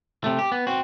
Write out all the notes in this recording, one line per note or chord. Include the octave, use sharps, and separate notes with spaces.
C3 A3
G4
B3
C4 F#4